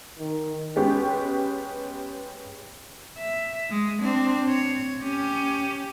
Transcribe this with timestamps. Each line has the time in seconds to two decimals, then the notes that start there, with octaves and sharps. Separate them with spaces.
0.19 D#3
0.76 G#3 B3 C#4 G4
3.18 E5
3.70 G#3
4.02 C4 D4
4.49 C#5
5.03 C#4 G4